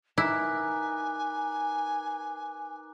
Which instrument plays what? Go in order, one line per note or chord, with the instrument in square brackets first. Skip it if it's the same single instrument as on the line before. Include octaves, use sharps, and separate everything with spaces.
[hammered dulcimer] D#4 A#4 B4 [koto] E4 [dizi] G#5 [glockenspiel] D6 F#6